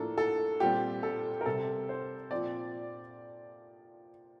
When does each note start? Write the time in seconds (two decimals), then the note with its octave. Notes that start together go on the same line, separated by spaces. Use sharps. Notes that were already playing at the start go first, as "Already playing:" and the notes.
Already playing: A2 F3 A#3 D4 A4
0.18 A4
0.60 A#2 G3 C4 G4
1.03 A4
1.41 A#4
1.46 C3 G3 C4 A4
1.89 C5
2.31 A#2 F3 C4 D5